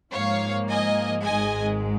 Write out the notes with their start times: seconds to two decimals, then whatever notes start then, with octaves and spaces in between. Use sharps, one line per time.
0.13 G#2 F3 A#3 C#5 F5
0.68 D#5 G#5
1.23 G#1 G#2 G#3 D#5 G#5